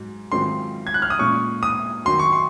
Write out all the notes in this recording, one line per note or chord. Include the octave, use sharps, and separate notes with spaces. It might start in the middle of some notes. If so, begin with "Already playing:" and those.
Already playing: G#2 F#3
G#2 D#3 F#3 C4 F4 C6
G#6
F#6
F6
D#6
A#2 G#3 C#4 C#6
D#6
D#3 F#3 C#4 F#4 C6
C#6
C6